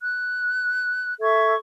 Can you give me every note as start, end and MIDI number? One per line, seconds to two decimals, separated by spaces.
0.01 1.15 90
1.21 1.54 69
1.21 1.54 76
1.21 1.54 85
1.21 1.54 92